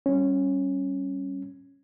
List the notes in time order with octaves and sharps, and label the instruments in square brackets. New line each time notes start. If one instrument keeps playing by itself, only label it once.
[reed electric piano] G3 C#4